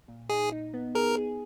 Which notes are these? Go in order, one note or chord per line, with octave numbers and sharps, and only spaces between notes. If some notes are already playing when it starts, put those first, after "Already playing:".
A#2
D#4 G#4
D#4
B3
G#4 A#4
G#4